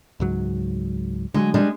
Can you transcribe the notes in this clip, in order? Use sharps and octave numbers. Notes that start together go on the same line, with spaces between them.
C#2 G#2 F#3
D3 E3 F#3 G#3
G3 G#3 D4